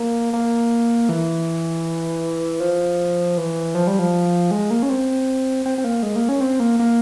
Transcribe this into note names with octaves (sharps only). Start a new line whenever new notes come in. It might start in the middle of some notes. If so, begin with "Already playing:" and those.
Already playing: A#3
A#3
E3
F3
E3
F3
G3
F3
G#3
A#3
C#4
C4
C4
C4
A#3
G#3
A#3
C#4
C4
A#3
A#3